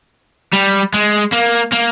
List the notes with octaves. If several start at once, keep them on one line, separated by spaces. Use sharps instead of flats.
G3
G#3
A#3
A#3